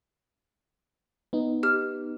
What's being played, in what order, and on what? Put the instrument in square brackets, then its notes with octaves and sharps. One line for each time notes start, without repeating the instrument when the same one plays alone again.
[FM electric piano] B3 D#4
[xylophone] G4 F6